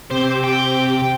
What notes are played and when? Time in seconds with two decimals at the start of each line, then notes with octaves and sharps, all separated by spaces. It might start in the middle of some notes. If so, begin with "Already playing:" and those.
0.11 C3 C4 G4 C5 D6
0.44 G5